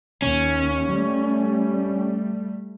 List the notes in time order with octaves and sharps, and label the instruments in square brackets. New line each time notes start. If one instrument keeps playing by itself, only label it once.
[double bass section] D#2 [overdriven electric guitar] C#4
[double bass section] G3 A3